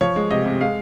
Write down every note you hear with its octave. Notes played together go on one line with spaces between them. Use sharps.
F3 C#5
G#3
C3 D#5
C3
G#3 F5